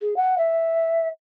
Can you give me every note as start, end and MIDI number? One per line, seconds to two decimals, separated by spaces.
0.01 0.14 68
0.16 0.37 78
0.38 1.08 76